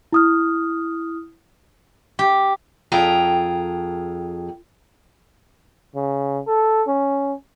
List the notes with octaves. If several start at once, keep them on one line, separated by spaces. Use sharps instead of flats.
E4 D#6 F6
G4
F2 G#4 G5 A#5
C#3
A4
C#4